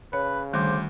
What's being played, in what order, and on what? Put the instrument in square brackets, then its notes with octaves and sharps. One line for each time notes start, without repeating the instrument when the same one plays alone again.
[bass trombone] C#3 [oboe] B4 [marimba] C#5
[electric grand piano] D2 D6 [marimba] D#3 G3 [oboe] C5